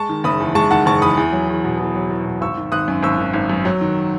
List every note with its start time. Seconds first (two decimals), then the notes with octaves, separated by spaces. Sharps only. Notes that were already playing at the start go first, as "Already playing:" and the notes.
Already playing: G#3 A5 C#6
0.09 D#3
0.24 F#1 B5 D#6
0.40 E2
0.55 G#3 A5 C#6
0.71 D#3 F#5 A5
0.86 F#1 A5 C#6
1.02 E2 B5 D#6
1.17 E2
1.33 F#3
1.49 E2
1.64 B2
1.79 E2
1.95 F#3
2.10 E2
2.25 B2
2.41 G#1 C#6 E6
2.57 D#3
2.72 G#1 D#6 F#6
2.88 F#2
3.03 G#1 C#6 E6
3.18 D#3
3.34 G#1
3.50 F#2
3.65 F#3
3.81 D#3